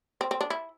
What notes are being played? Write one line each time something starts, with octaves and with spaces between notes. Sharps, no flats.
C4
C4
D4
E4